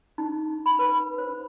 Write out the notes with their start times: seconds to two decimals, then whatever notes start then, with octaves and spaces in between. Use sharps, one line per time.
0.18 D#4
0.66 B5
0.79 B4
1.18 C5